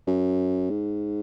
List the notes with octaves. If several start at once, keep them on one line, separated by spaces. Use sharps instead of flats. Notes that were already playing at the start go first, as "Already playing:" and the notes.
F#2
G#2